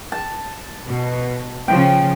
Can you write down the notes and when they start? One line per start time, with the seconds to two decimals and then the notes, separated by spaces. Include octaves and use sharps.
0.12 A5
0.87 B2
1.68 C#3 F3 G5